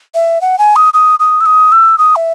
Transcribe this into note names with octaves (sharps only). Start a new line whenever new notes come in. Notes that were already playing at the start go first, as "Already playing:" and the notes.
E5
F#5
G#5
D#6
D#6
D#6
E6
D#6
E6
D#6
E5